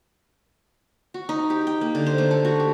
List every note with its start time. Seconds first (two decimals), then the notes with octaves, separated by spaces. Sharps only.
1.14 F#4
1.29 D#4
1.50 G4
1.67 G5
1.81 A#3
1.95 D3
2.06 C5
2.18 A3
2.31 A4
2.45 F#4
2.60 G4